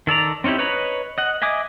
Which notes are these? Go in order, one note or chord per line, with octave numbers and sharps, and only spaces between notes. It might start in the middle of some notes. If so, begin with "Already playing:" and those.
D#3 A4 D5 A#5
C4 C#4 D#4 E4 G4
B4 C#5 D#5 A#5 B5
D#5 F#5
D#5 E5 G#5 D6 D#6